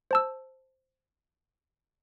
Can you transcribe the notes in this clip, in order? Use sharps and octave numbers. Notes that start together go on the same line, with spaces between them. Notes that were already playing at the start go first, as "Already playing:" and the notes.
C5 A5 E6